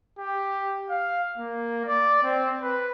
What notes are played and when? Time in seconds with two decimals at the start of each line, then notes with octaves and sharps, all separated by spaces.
0.19 G4
0.90 F5
1.37 A#3
1.86 D5
2.23 C4
2.62 B4